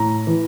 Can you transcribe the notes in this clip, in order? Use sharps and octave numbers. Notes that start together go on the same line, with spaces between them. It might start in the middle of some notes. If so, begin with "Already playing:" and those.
Already playing: A2 A#5
E3